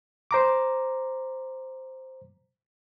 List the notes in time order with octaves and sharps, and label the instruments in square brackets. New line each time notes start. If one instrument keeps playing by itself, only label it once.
[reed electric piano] C5 A#5 D6